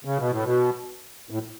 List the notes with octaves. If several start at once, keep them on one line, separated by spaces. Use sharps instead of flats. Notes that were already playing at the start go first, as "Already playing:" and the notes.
C#3
B2
A2
B2
A2